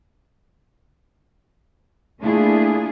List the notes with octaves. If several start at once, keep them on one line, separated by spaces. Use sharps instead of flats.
A3 A#3 D4 E4 F4 G#4